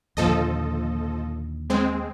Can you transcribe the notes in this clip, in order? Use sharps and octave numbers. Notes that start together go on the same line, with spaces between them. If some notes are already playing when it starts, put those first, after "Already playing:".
D#2 A#2 D3 F3 A4 D#5
G#3 C4